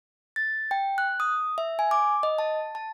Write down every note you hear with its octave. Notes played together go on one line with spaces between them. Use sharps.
A6
G5
F#6
D#6
E5
G#5
D6
D#5
A5
A5